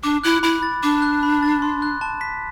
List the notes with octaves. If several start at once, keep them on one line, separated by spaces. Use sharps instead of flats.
D4 D6
E4 F#6
E4 B5
A6
D4 D6
F#6
B5
A6
C6
F#6
A5
B6